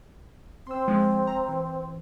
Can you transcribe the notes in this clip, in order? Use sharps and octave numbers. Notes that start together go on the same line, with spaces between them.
C4 C6 E6
F3 G#3
A#5
E3